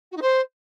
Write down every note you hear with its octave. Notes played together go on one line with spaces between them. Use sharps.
F#4
D#4
C5